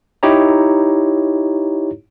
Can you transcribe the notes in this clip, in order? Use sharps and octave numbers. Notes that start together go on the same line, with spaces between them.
D#4 E4 G4 C#5 A#5